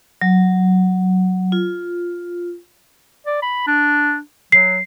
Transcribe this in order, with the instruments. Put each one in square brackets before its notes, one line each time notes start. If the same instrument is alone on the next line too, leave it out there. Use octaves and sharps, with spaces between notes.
[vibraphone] F#3
F4
[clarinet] D5
B5
D4
[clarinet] F#3 [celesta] C7